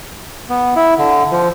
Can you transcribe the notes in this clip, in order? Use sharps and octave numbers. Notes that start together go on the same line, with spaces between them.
B3
E4
D3
F3